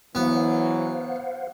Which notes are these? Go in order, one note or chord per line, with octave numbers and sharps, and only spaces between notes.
E3 F#3 B3 C5 F5 F#5